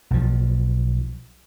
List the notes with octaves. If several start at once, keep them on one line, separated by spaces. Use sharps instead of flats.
B1 F3